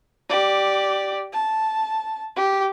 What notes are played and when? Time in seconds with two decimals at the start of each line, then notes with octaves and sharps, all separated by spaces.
0.29 G4 D5
1.33 A5
2.36 G4